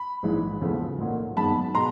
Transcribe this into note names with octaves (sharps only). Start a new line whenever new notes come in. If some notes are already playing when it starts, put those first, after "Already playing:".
Already playing: B5
A#1 G#2 E3 G#3
E1 E2 C#3 F3 A3
B1 A#2 F#3 A#3
G1 F#2 D#3 G#3 B3 A5 B5
B2 G#3 A#5 C6